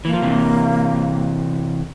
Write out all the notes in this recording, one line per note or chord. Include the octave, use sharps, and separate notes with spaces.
E3 A#3
F3
C3 E3